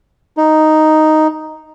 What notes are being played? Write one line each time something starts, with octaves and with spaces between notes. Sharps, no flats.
D#4